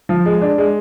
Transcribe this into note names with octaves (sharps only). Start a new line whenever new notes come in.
F3
G#3
D4
G#3